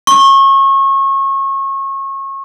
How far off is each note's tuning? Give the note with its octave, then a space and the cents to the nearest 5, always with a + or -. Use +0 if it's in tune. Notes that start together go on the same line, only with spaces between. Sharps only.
C#6 -30